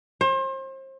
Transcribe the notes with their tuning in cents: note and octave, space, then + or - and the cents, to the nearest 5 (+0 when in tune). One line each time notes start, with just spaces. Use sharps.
C5 +35